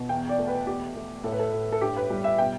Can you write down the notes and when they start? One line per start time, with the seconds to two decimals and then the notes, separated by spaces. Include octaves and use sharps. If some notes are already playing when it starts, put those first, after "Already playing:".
Already playing: B2
0.09 E2 G5
0.29 D5
0.39 A3
0.48 B4
0.67 E2 G4
0.96 A3
1.24 A2 A4
1.32 B4
1.39 A4
1.53 A2
1.72 A4
1.81 G2 G4
1.97 B4
2.10 G3
2.24 E5
2.38 B2 G5